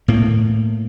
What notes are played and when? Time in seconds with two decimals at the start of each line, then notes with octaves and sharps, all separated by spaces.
0.08 A2 A#3